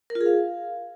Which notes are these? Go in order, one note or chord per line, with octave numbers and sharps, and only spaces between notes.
A#4
F4
G#4
F5